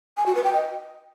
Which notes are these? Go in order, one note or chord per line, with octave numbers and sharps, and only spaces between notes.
G#5
F#4
B4
G5
D#5